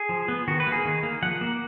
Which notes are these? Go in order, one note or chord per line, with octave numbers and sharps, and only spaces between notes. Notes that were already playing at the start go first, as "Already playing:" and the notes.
Already playing: G#4
F3
B3
D#3 F#4
B4
A#3
G#4
D#3
A#3
F3 F#5
A#3